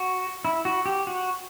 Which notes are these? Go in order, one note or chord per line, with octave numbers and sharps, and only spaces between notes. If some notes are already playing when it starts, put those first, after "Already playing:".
Already playing: F#4
E4
F#4
G4
F#4